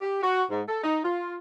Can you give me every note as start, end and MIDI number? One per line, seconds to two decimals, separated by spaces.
0.02 0.22 67
0.23 0.43 66
0.50 0.61 44
0.68 0.83 69
0.84 1.00 63
1.05 1.38 65